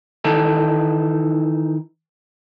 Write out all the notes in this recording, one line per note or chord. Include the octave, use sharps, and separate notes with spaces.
D#3 E3 D#4 A4